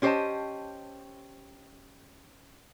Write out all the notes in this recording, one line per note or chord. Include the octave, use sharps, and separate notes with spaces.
C#4 G4 C5 D5 D#5 A5